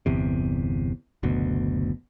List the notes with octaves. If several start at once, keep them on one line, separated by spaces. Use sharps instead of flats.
G1 E2 C3
F#1 D2 B2